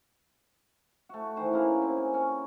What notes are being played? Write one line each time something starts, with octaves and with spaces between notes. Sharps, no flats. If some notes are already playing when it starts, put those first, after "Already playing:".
A3 F#4
D#3 E3 C5
C#3 A#3 E4 A#4
C4
G#5
C#4